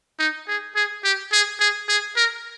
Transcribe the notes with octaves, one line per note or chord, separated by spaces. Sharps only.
D#4
G#4
G#4
G4
G#4
G#4
G#4
A#4